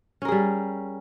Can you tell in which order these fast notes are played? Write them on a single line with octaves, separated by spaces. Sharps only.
C#4 A#4 G#4 G3